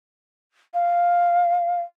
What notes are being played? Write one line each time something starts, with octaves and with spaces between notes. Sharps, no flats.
F5